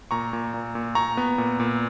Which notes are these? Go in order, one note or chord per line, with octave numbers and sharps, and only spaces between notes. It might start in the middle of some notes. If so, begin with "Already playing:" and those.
A#2 A#5 C#6
A#2
A#2
A#2
A#2 A#5 C#6
B3
A#2
A#2